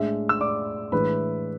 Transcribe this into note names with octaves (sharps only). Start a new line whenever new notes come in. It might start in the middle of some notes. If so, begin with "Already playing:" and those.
Already playing: A2 G#3 D4 E5
E6
D5 D6
A2 E3 G#3 D4 B4 B5